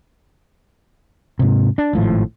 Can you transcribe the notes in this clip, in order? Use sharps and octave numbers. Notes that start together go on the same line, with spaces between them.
G#2 C3
D4
G#1 A2 F3